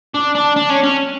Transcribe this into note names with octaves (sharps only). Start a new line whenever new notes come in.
D4
D4
D4
C#4
C#4